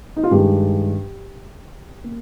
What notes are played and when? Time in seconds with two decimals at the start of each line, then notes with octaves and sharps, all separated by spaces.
0.16 D#4
0.23 F4
0.31 G2 D#3 G#3 G4
2.04 A#3